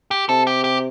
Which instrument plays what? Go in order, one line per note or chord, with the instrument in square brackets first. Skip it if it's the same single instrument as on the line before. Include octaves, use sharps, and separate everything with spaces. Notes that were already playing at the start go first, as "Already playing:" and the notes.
[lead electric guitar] G4
[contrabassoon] C3 [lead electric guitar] A4
[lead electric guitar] G4
G4